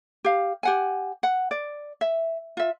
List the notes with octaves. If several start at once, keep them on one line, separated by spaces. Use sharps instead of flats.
G4 F5
G4 F#5 G#5
F#5
D5
E5
F4 E5